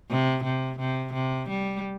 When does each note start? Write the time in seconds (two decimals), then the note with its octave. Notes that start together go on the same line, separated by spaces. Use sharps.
0.10 C3
0.44 C3
0.79 C3
1.13 C3
1.49 G3